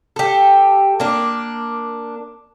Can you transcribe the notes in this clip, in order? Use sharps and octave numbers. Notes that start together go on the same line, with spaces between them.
G4 A4
A#3 D4